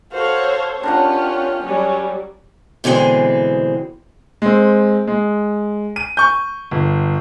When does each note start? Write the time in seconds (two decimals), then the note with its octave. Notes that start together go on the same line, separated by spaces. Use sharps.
0.12 F#4 A4 C5 C#5 F5
0.83 C#4 D4 F4 G4 A#4 F#5
1.64 F#3 G3 C#4
2.84 B2 D3 E3 G#3 C4
4.42 G#3 C4
5.07 G#3
5.96 D#7
6.17 C#6 G6
6.71 G1